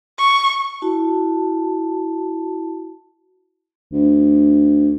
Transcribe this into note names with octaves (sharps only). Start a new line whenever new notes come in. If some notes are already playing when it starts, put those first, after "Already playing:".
C#6
E4 F#4 A5
D2